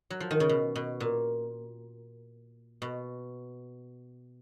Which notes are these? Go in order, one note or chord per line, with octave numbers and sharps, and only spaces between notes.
F#3
F3
D#3
C#3
B2
B2
A#2
B2